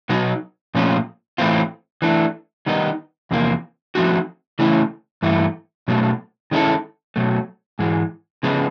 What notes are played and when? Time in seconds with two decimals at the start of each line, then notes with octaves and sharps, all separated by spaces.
0.09 B2 F#3 B3 D#4
0.75 A#2 F3 A3 C#4 F4
1.38 A2 E3 A3 C4 F4
2.02 E3 A3 D4
2.66 D#3 G3 B3 D#4
3.31 E2 C3 F3 A#3
3.95 F3 A3 C4 D#4 F#4
4.59 C#3 E3 A3 C#4 E4
5.22 G2 E3 A3
5.88 B2 F#3 A3
6.51 D#3 G#3 C#4 E4 A4
7.16 B2 F#3 A3
7.79 G#2 E3 G#3
8.43 C#3 F3 G#3 B3